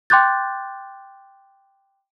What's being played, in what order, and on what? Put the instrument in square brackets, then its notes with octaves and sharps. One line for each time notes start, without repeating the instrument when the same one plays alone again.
[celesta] G5 C6 D6 F#6 G6 A6